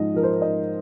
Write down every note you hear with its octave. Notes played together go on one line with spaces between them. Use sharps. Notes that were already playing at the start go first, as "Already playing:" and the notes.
Already playing: G#2 F3 D#5
F3 A#4
C5
G#2 D#5